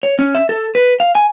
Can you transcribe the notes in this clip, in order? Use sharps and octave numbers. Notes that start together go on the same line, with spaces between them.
C#5
C#4
E5
A4
B4
F5
G#5